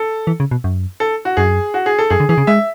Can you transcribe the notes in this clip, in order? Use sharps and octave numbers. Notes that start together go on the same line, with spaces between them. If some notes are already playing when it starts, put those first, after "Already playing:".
Already playing: A4
E3
C#3
B2
F#2
A4
F#4
F#2 G#4
F#4
G#4
A4
F#2 G#4
D3
E3 G#4
C#3
G#3 E5